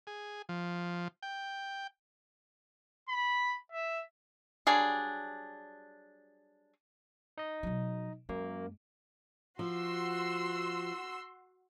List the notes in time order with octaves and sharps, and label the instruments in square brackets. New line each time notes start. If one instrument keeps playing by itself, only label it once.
[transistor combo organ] G#4
F3
G5
[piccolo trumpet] B5
E5
[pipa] F#3 G3 D4 G#4
[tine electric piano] D#4 D#5
[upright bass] B2 F#3
[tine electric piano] F#2 A#3 [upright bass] G#3
[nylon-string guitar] F3 [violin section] F#4 C6 E6